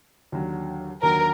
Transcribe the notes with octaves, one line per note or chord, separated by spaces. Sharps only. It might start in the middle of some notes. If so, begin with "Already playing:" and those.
D#2 D3 F#3
D#2 D3 F#3 A#4